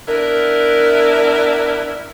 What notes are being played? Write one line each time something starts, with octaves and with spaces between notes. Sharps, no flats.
B3 D4 E4 A#4